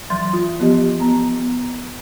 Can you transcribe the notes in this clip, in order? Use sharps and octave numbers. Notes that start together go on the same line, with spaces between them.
E3 F#3 C6 A6
F4
F3 B3 G4 D#5
B3 A#5